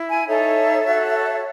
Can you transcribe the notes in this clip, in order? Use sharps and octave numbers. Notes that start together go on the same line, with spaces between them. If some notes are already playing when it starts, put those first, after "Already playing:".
Already playing: E4
G#5
D#4 A4 C#5 E5
F#4 A4 C#5